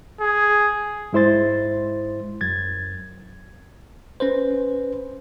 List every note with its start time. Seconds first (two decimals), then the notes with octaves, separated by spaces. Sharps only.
0.20 G#4
1.13 G#2 G#3 E4 C5 C6 A6
2.41 F#2 G#6 A6
4.20 C#4 B4 C5